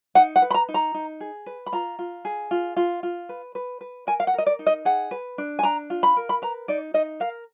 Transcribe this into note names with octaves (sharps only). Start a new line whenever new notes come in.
D#4 F#5
F#5
B4
B5
A#5
D#4
A#5
D#4
G#4
B4
B5
F4 A#5
F4
G#4
F4
F4
F4
B4
B4
B4
A#4 G#5
F5
F#5
A#4 D#5
D5
D#4
D#5
G#4 F#5
B4
D4
G#5
D4 A#5
F4
B5
A#4
B5
B4 A#5
D#4 D5
D#4 D#5
A#4 F5